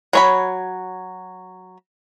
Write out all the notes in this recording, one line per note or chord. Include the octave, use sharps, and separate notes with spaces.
F#3 C#5 B5